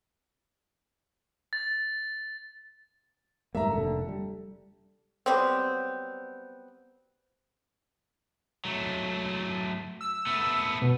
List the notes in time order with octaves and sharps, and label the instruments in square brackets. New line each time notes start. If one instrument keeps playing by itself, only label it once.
[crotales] A6
[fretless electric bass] G#2 G3 A#3 [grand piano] E5 A#5
[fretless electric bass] F1 A#2 D3 [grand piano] A4
[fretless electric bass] G3
[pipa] F#3 G3 B3 C4
[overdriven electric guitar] F#3 A3
[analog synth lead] E6
[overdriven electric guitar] A3 B3
[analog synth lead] B2